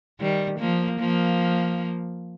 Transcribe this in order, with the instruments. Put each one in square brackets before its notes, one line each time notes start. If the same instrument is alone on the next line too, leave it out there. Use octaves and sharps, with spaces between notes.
[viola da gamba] D#3 G3
F3 A#3
F3 A#3